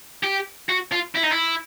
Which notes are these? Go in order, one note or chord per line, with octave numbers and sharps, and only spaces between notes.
G4
F#4
F4
E4
D#4
E4